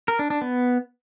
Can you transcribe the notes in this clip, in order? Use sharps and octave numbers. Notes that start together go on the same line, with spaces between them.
A#4
D4
D4
B3